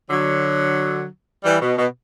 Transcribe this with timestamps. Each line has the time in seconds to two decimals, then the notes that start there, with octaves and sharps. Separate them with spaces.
0.10 D3 F#3
1.45 E3 G3
1.61 B2
1.78 B2